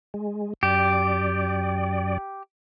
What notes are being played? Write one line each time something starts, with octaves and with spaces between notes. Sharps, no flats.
G#3
F#2 G4 D5